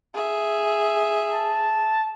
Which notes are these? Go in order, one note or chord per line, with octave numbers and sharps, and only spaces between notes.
G#4 E5
A5